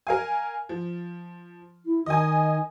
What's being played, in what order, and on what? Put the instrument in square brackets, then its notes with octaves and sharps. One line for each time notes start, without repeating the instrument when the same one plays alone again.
[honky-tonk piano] A#4 F5 G#5
F3
[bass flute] E4
[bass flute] D#3 [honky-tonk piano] D#5 G#5